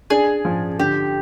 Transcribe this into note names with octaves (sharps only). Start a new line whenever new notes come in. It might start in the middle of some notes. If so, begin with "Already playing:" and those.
D4 G#4
F3
D3 G4